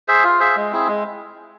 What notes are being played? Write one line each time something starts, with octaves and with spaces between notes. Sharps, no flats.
G#4 C5 E5
F4
G#4 C5 E5
G#3
C4 E4 G#4
G#3